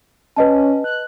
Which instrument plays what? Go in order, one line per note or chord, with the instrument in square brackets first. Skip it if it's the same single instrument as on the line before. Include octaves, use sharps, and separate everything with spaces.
[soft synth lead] C#4 [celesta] B4 D#5 A5
[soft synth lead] F#6